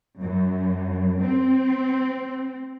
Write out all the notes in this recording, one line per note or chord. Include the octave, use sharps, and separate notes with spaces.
F#2
C4